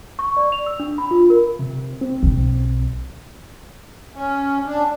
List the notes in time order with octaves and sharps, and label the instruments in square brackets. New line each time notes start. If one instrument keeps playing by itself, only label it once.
[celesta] C#6
D5
F7
E6
D4
B5
F4
A#4
[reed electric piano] C3
C4
[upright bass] B1
[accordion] C#4
D4